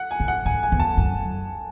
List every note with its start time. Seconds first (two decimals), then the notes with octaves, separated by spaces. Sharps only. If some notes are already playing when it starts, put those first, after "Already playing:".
Already playing: F#5
0.11 G#5
0.20 A2
0.28 F#5
0.45 G#2 G#5
0.63 G#5
0.72 E2
0.80 A5
0.97 F#2